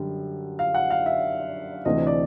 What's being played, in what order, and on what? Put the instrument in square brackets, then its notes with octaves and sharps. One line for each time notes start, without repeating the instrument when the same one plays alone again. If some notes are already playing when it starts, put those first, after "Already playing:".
Already playing: [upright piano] F#2 D3 G3
F5
F#5
F5
E5
D2 C3 E3 A3 D4 D#5
D5